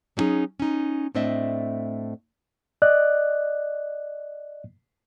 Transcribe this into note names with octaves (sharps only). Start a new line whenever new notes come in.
F#3 G3 C#4 D#4 G#4
C#4 D#4
A2 A3 C4 D4 D#5 E5
D5 D#5 F#6